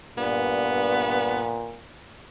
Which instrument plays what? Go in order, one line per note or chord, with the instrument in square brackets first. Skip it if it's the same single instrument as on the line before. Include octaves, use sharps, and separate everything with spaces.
[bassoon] G2 [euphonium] A#2 [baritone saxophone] B3